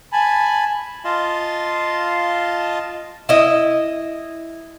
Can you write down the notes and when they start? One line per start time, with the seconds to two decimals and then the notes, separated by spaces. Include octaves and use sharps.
0.12 G#5 A5 B5
1.05 F4 D#5 F5 A5 C6
3.29 E4 D#5